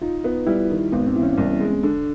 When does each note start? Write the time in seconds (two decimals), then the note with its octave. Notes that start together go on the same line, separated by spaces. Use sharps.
0.02 D#4 F4
0.24 B3
0.47 G3 E4
0.70 D#3
0.92 G#1 B3
1.07 C4
1.16 E3
1.23 C#4
1.38 C2
1.61 G#3
1.83 D3 D4